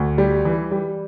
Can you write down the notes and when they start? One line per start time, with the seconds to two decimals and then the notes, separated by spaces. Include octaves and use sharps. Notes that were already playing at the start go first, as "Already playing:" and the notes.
Already playing: D2
0.18 G3
0.45 E3
0.71 G3